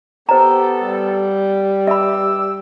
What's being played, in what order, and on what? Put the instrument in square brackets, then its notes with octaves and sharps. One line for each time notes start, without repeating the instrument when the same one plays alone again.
[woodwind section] B3 A4 [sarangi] G4 [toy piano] C5 A#5
[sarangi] G3
[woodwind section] G2 D6 E6 [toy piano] E5 B5